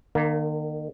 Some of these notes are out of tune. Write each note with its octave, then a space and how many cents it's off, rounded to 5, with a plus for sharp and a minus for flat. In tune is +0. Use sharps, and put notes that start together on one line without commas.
D#3 -40 A#3 +0